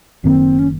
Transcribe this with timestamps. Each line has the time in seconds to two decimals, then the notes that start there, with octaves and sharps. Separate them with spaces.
0.24 F#1 F#2 D#3 A#3 C4
0.59 C#4